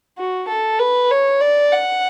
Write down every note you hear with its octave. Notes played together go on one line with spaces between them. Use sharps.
F#4
A4
B4
C#5
D5
F#5